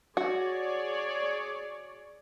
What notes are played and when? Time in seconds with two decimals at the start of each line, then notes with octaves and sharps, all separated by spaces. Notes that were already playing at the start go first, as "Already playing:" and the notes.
0.17 F#4 G#4 C#5 D5